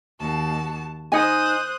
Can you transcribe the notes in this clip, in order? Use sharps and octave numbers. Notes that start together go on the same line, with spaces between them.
D#2 F#4 A5
D#4 C5 D#5 G#5 D#6 F#6